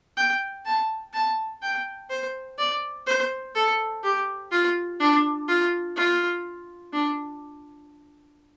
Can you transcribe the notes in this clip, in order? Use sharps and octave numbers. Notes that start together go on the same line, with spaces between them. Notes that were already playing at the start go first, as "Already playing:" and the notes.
G5
A5
A5
G5
C5
D5
C5
A4
G4
F4
D4
F4
F4
D4